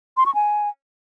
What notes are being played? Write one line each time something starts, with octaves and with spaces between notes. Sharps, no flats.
C6
C#6
G#5